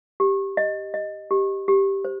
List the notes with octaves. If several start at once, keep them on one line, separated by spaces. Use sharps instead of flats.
G4
D#5
D#5
G4
G4
C5